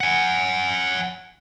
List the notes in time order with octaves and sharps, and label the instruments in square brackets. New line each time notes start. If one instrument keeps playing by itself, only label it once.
[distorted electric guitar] F#5 G#5